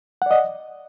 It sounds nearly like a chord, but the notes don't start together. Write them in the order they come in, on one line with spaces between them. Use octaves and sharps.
F#5 D5 D#5